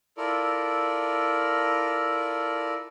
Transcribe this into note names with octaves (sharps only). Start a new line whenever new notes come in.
E4 F4 A4 A#4 D5